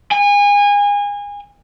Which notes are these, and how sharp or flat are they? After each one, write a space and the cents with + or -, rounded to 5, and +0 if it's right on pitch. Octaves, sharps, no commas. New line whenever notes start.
G#5 -30